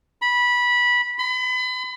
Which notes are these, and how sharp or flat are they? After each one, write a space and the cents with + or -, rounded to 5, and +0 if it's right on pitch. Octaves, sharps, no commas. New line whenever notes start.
B5 -15
B5 +35